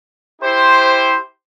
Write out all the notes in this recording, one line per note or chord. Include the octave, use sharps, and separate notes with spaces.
E4 G4 C5